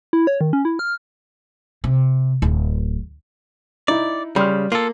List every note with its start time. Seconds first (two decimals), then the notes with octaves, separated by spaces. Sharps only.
0.13 E4
0.27 C#5
0.41 D#3
0.53 C#4
0.65 E4
0.79 F6
1.84 C3
2.42 D1
3.88 D#4 E4 D5
4.36 C#3 G3 B5 C6 F6
4.72 A#3 F4 A4